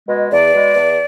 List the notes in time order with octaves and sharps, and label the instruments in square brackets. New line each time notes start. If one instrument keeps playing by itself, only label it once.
[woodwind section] B2 G#3
E2 D5
B2 G#3
E2